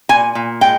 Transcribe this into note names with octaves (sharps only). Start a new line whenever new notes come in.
A#2 G#5
A#2
G#3 G5